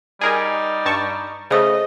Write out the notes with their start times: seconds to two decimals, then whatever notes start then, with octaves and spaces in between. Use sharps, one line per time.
0.21 G3 D#4 G#4 A#4 G#5
0.86 G2 A5 C#6
1.51 C#3 A3 G#4 C5 D#5 D#6